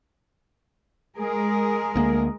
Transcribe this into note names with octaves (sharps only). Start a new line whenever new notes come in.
G#3 G#4 A#4
D2 A#3